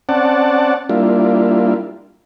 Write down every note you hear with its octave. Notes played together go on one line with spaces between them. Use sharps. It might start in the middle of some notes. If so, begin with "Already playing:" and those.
C4 C#4 D5 F#5 A5
G3 A#3 D4 E4 F4